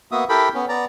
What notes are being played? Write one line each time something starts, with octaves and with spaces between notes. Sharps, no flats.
A#3 B3 F#4 E5 D#6
E4 G4 A4 A#4 G5 B5
B3 C#4
B3 D5 A#5